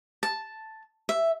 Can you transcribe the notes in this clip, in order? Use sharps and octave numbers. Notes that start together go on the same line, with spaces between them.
A5
E5